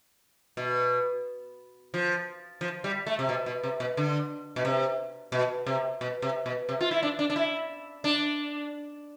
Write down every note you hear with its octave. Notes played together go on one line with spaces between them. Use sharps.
B2
F3
F3
G3
A3
C3
B2
B2
C3
B2
D3
B2
C3
B2
C3
B2
C3
B2
C3
F4
E4
D4
D4
D4
E4
D4